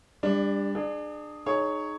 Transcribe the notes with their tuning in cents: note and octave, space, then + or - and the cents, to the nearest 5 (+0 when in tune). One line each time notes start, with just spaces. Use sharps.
G3 +30 D4 +0
D4 +30 G#4 +0
D#4 -15 G#4 +20 C#5 +0